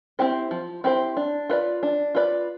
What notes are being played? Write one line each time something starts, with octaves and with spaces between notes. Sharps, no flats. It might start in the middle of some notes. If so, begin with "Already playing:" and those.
C4 E4 G4 C5
F3
C4 E4 G4 C5
D4
F4 B4 D5
D4
F4 B4 D5